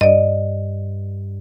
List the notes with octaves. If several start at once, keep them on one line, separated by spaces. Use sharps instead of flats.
G2 D5 D#5